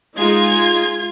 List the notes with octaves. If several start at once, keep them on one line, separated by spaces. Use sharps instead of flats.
G#3 D#4 F4 G#6